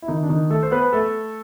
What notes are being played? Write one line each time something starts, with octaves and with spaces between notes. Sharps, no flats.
E4
D#3 D#4
D4
D#3 D#4
A3 A4
C5
B3 B4
A3 A4